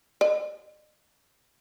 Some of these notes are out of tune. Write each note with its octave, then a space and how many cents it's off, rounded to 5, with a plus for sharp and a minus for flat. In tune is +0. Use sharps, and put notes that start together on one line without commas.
D#5 -45